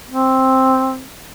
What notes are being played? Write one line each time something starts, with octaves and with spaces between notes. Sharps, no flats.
C4